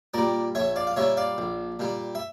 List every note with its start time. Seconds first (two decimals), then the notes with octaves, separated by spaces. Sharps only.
0.14 A#2 G3 A#4 D5
0.55 A#1 C#5 E5
0.76 D5 F5
0.87 F5
0.96 A#2 G3 C#5 E5
1.17 D5 F5
1.38 A#1
1.79 A#2 G3
2.15 E5